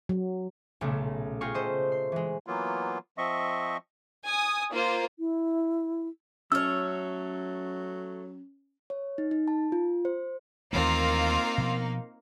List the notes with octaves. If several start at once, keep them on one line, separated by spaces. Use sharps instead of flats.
F#3
B1 A#2 C#3 A3 B3
F4 G4 G#4 A#4 C#6
A3 C5 D#5
C6
E3 G#3
E3 F#3 A#3 B3 F4
F3 C4 D#5 E5 C#6
G#5 D#6
A#3 F4 C5
E4
F#3 A3 C#4 C#5 E6 F6
C#5
D#4
D#4
A5
F4
C5
D#2 E3 A3 A#3 C4 D#4 F4 F5
B2 F3 B3